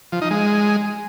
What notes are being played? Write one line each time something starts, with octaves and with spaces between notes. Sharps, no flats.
F3
D#4
G#3